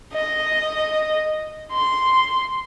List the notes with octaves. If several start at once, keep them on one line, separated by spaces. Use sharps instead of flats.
D#5
C6